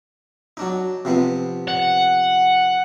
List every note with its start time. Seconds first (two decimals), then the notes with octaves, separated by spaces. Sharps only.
0.57 F#3 D4 D#4
1.05 C3 F3 B3
1.68 F#5